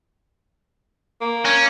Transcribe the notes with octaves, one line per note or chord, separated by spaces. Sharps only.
A#3
C#4